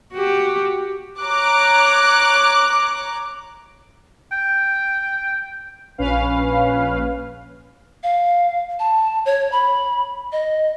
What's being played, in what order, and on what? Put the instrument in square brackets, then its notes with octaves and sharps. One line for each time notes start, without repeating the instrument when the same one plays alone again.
[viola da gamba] F#4 G4
[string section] C#5 A#5 D6 F#6
[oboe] G5
[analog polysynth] A#1 C#4 B4 F5
[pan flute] F5
A5
C#5
B5
D#5